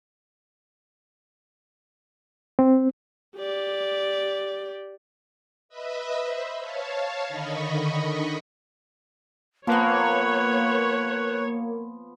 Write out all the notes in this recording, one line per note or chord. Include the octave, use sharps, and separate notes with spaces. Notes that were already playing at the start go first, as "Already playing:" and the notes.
C4
G4 D5
B4 D#5 E5 B5
C5 E5
C#5 F5 A5
D3 D#3 D#5 B5 C#6
F3 A#3 B3 B4 C#5